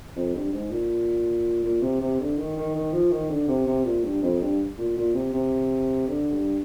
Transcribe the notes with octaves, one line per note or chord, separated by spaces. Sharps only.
F2
G2
G#2
A#2
A#2
C3
C3
D3
D#3
D#3
D#3
F3
D#3
D3
C3
C3
A#2
G2
F2
G2
A#2
A#2
C3
C3
D3
G2